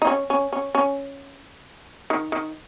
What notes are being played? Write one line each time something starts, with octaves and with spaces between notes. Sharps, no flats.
D#4
C#4
C#4
C#4
C#4
D#3
D#3